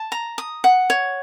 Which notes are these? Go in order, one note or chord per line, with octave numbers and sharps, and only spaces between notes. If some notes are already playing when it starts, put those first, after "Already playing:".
Already playing: A5
A#5
D#6
F#5
C#5